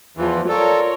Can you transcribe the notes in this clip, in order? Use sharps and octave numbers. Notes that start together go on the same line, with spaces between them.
E2 E3 F3 F4
F4 A4 A#4 C#5 D5